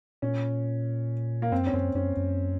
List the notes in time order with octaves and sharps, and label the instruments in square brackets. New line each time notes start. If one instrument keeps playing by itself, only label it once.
[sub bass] A#2 [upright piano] C#4
[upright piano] A#3
[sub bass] F#2 [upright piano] C4
[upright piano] C#4
[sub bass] F#2 [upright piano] C4
[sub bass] F#2 [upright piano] C#4
[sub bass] F#2